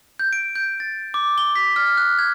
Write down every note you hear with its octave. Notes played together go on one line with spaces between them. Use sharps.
G6
D7
G6
A6
D6
G7
B6
F6
F#6
G#6